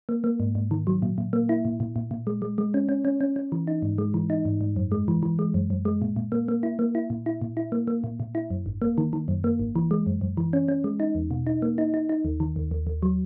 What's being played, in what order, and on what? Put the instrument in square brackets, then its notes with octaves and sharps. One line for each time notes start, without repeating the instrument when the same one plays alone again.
[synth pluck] A#3
A#3
G#2
G#2
D#3
F#3
A#2
A#2
A#3
E4
A#2
A#2
A#2
A#2
G#3
G#3
G#3
C#4
C#4
C#4
C#4
C#4
E3
D#4
G#2
G#3
E3
D#4
G#2
G#2
F#2
G#3
E3
E3
G#3
F#2
F#2
G#3
A#2
A#2
A#3
A#3
E4
A#3
E4
A#2
E4
A#2
E4
A#3
A#3
A#2
A#2
E4
F#2
G#1
A#3
D#3
D#3
F#2
A#3
G#1
E3
G#3
F#2
F#2
E3
C#4
C#4
G#3
D#4
E2
B2
D#4
A#3
D#4
D#4
D#4
D#2
D#3
D#2
D#2
D#2
F#3